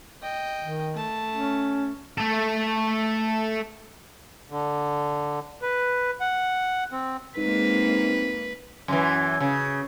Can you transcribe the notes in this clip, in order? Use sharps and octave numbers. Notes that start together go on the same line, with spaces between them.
D#5 G5
D#3
A3 A5
C#4
A3 A4
D3
B4
F#5
C4
G#2 G#3 A#3 C4 B4
F#2 D3 E3
C#3